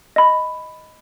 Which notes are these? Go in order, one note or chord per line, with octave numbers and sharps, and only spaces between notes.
D#5 B5